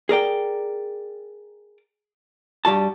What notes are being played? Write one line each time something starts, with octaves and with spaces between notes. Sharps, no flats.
G#4 A#4 D5 G5
G2 G3 F#4 A5